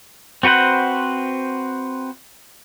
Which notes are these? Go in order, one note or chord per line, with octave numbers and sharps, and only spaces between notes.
C4 F#4 B4 C5 F#5